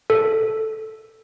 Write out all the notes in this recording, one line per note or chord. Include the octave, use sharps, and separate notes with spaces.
A4